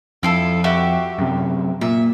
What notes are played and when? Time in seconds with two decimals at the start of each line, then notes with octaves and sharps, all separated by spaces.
0.23 F2 E4 F4 A4
0.64 F#4 G4 E5
1.18 F#2 C3
1.81 A#2 E5